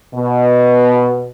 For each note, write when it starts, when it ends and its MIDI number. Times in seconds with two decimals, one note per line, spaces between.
0.15 1.30 47